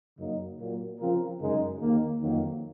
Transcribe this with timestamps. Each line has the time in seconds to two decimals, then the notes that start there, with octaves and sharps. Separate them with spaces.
0.18 F#2 C#3 F#3 A#3 D#4
0.59 A#2 F#3 A#3
1.00 C#3 F3 C4 F4 A#4
1.40 F#2 C#3 G#3 D#4 A#4
1.81 D#2 D#3 A#3
2.22 F2 D#3 F#3 A#3